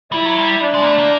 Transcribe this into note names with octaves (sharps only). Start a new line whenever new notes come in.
G3 E4
F#3
G3
D4
G#3
A#3
A3
A#3